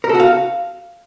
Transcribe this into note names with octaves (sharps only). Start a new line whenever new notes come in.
A#4
A4
F#4
F5